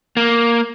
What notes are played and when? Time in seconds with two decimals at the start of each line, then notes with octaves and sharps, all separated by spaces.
0.17 A#3